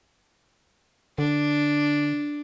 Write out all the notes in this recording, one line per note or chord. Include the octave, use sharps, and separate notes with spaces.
D3 D4